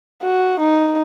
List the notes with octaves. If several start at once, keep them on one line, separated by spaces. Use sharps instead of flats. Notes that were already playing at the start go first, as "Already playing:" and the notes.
F#4
D#4